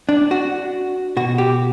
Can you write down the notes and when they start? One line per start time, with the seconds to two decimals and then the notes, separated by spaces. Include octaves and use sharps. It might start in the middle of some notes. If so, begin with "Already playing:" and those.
0.09 D4
0.31 F#4
1.17 B2 F#4
1.38 G4